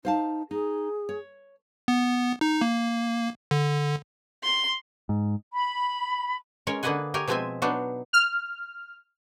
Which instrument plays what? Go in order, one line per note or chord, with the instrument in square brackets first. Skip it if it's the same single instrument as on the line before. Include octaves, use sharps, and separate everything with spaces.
[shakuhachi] D#4 [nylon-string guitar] C5 F5 A5
[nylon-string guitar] D#4 [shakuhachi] G#4
[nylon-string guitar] C#5
[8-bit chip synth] B3
D#4
A#3
D3
[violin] C6
[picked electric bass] G#2
[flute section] B5
[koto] G#3 C#4 A#4 C#5
D3 A#3 B4 D#5 F#5 G#5
G4 A#4 C#5 G#5
B2 F3 G#3 C4 E5 G#5
F#3 B3 D4 D#4
[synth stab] F6